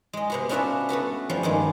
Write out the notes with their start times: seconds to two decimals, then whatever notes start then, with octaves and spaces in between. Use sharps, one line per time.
0.13 G#3 D#5
0.30 C3 B3 F#4
0.49 C#4 D4 F4 F#4 B4 E5
0.89 A3 B3 F#4 B4
1.29 F3 G3 C#4
1.43 G2 D#3 G#3